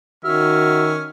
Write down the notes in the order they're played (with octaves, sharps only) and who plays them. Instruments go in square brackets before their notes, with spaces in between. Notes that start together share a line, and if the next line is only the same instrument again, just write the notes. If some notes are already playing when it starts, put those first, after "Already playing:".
[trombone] D#3 [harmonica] C#4 F6 [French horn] F#4 [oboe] E5